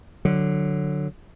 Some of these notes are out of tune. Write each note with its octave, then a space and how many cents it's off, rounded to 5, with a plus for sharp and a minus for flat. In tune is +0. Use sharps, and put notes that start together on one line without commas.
D3 +10 F#3 -5